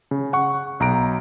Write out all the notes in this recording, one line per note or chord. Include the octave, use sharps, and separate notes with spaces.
C#3
F#5 C#6
B1 A#5 D7